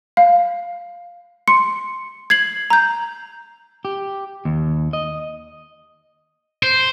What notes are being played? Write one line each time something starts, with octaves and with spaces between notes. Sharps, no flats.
F5
C6 C#7
G#6 C7 F#7
A#5 G6
G4
D#2
D#5
C5